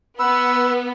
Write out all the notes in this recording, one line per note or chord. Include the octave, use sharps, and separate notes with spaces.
B3 B4 B5 E6